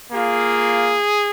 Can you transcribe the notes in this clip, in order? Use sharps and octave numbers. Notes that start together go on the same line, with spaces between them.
A#3 F4 G#4